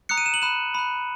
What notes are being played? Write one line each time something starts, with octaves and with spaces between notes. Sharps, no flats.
A#5 D#6 F#6 C#7
D#7
E7
F#7
B5 F#6 E7
B5 F#6